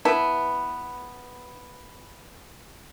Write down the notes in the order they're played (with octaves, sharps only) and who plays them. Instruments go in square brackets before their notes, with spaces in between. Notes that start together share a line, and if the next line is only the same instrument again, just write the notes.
[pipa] B3 E4 B4 A5